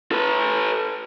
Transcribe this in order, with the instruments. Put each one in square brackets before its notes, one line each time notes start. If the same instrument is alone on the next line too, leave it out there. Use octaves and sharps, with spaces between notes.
[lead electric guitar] A4 B4